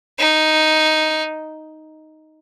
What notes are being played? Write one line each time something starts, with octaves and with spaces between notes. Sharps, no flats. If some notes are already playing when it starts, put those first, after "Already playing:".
D#4